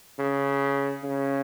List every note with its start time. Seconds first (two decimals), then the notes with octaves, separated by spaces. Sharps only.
0.19 C#3
1.04 C#3